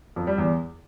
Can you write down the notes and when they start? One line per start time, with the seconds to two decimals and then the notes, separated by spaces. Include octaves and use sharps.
0.16 F2
0.27 G3
0.38 E2